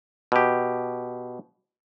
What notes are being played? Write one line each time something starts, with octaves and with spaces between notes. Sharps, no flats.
B2 G4